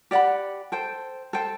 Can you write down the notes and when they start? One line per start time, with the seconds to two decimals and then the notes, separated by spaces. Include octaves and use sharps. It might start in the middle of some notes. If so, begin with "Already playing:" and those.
0.11 G4 D5 F#5 B5
0.72 A4 C5 G5
1.33 A4 C5 G5